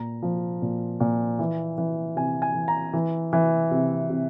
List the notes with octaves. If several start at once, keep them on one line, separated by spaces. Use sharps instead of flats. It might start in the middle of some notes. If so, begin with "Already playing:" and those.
Already playing: A#2 A#5
F3
A#2
A#2
E3
E3
C3 G#5
G#5
E3
A#5
E3
E3
C3
C3